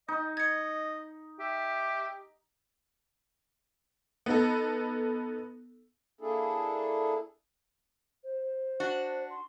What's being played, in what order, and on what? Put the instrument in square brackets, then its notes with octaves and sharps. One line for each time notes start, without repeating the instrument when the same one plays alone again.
[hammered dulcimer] D#4 [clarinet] D#5
[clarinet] D#5 [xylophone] G#6 C#7
[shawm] G4 [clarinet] E5
[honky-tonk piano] B3 D#4 A4
[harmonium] A#3 D4 E4 G#4 A4
[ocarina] C5
[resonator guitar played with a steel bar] D4 F#4
[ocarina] C6